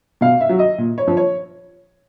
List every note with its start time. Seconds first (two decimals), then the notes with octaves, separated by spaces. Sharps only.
0.21 B2 F5
0.41 E5
0.49 F#3
0.59 D#5
0.78 A#2
0.98 C#5
1.07 F3
1.17 C#5